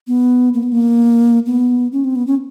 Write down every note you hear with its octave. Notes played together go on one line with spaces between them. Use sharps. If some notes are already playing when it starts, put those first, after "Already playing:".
B3
A#3
B3
A#3
B3
C#4
C4
B3
C#4